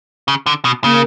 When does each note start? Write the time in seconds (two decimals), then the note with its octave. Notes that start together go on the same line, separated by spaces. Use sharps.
0.28 C#3
0.46 D3
0.65 B2
0.84 C#3 A#3